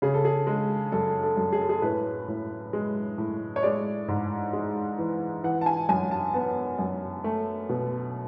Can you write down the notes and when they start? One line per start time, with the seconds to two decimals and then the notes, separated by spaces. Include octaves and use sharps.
0.02 C#3 G#4
0.14 A4
0.25 G#4
0.47 G#3
0.92 F#2 A4
1.23 A4
1.37 F#2
1.53 G#4
1.61 A4
1.69 G#4
1.82 A2 B4
2.28 A2
2.73 G#3
3.18 A2
3.56 C#5
3.63 G#3 D5
4.08 G#2
4.53 G#3
4.98 E3
5.43 E3 F#5
5.61 A5
5.66 G#5
5.89 F#2 G#5
6.11 A5
6.34 B3 A5
6.79 F#2
7.24 A3
7.69 B2